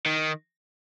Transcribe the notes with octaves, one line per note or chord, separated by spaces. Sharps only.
D#3